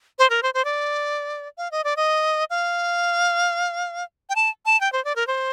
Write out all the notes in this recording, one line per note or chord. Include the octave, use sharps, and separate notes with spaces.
C5
A#4
C5
C5
D5
F5
D#5
D5
D#5
F5
G5
A5
A5
G5
C5
D5
A#4
C5